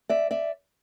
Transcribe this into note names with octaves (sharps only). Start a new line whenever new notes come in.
D5 E5
D5 E5